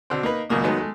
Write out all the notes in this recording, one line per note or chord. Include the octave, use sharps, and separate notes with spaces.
B2 D3 C4
A#3 D#4 B4
G#1 C#2 F#2 A#2 A#3 D#6
D#3 F#3 G#3 A3 B3 D#4
G#3 A3